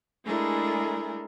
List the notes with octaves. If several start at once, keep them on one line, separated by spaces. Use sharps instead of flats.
G#3 A3 D4 E4 G#4 A#4